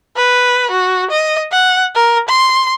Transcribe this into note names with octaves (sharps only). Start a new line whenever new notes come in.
B4
F#4
D#5
F#5
A#4
C6